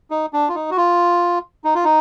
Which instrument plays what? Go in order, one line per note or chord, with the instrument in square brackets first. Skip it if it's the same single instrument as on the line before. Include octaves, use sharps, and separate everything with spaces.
[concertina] D#4
D4
F4
D#4
F#4
F4
D#4
F4
D#4